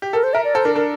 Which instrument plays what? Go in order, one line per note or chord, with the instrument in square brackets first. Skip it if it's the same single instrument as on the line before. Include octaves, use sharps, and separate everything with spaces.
[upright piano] G4
[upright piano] A4 [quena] A#4
[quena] C5
[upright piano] A#4 [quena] E5
[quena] D5
[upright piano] A4 [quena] C5
[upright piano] D4 [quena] A#4
[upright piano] D4 [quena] A#4